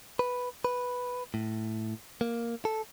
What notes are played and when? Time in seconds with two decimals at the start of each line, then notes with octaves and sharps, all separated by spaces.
0.19 B4
0.65 B4
1.34 A2
2.21 A#3
2.65 A4